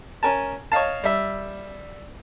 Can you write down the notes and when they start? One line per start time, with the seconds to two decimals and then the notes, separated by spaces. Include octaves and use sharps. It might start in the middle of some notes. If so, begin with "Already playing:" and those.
0.23 C#4 A#4 G#5 A5
0.72 C#5 D#5 F5 A5
1.04 G3 E5